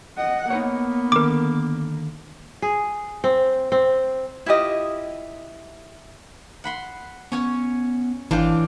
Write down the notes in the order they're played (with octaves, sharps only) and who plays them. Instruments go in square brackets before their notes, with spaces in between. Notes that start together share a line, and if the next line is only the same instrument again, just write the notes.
[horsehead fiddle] D#5 F#5
[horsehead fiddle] A#3 [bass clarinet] B3 [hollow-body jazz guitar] D#4 B4 C#5
[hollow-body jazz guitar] D3 D#3 [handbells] A#4 D6
[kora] G#4
C4
C4
[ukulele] E4 F4 G4 D#5
[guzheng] F#5 B5 C6
[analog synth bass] B3 [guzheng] C#4 C#5 G#5
[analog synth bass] G#1 [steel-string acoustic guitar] A2 E3 [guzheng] D4 F4 G5